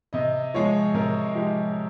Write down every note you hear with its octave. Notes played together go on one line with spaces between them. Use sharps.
C3 D#5
F3 G#3 C#5
C3 A#4
F3 G#3 G4